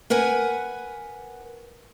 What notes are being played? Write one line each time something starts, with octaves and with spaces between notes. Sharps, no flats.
A#4 B4 F#5 G#5